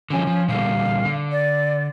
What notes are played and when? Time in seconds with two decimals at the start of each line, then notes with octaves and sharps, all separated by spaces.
0.10 D3 E3 F3 C#4
0.27 F3
0.48 A#2 D3 G3 F5
1.05 D3
1.32 D5